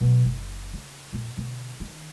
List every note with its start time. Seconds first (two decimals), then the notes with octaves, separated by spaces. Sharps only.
0.01 B2 F#3
0.25 F#1
0.73 C#3
1.13 F2 A#2
1.37 B2 D3
1.80 D#3